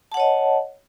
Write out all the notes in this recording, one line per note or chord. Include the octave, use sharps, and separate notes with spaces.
C#5 D#5 F#5 A5